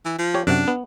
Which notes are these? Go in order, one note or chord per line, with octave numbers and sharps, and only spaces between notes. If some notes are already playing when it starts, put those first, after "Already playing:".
E3
F3
G4 C#5
F#2 C3 D4 F#5
B3